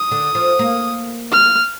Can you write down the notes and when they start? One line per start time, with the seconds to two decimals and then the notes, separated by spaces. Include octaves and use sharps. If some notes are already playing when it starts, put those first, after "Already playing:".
Already playing: D#6
0.11 D3
0.35 F3
0.59 A#3
1.33 F6